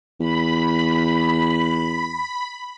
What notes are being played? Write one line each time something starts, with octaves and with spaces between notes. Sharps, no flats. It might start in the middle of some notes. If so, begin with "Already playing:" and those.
E2 B5